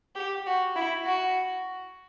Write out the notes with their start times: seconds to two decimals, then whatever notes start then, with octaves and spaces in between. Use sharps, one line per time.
0.16 G4
0.46 F#4
0.76 E4
1.05 F#4